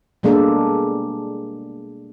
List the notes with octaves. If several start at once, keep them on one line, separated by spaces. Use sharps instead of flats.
B2 G3 G#3 A#3 D4 A4